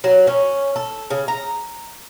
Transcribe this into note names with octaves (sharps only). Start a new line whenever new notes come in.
F#3
C#4
A4
C#3
A#5